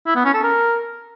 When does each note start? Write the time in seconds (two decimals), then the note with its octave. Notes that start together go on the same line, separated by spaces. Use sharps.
0.06 E4
0.16 B3
0.25 C#4
0.34 A4
0.43 A#4